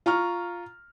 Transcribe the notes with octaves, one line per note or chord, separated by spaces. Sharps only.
F4 A#5 C#6 F6